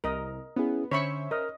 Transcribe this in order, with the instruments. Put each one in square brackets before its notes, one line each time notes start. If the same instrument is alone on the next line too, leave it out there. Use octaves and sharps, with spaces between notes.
[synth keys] C2 [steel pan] A#4 D#5
[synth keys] B3 [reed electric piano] C#4 E4 G#4
[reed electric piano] D3 [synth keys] C#4 C5 E5 [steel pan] C#5 B5 C#6
[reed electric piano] A#4 F6 [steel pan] D#5